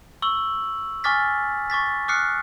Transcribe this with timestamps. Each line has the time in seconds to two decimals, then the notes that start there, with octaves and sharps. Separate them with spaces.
0.22 C#6 E6 F#7
1.04 G#5 C#6 D6 F6 A6 B6
1.70 C#6 D6 A6 B6
2.08 D6 D#6 F6 F#6 C7 C#7